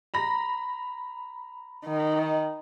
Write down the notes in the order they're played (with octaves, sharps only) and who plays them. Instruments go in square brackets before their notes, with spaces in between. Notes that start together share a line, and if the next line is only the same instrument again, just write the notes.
[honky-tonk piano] A#5 B5 A#6
[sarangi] D#3